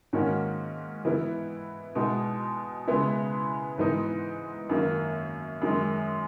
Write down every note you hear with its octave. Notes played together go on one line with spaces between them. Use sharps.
G#2 D#3 A#3 C#4 F#4
E3 B3 E4
B2 G#3 D#4 F#4
C#3 G#3 B3 E4
G#2 E3 B3 D#4
F#2 D#3 A#3
F#2 D#3 G#3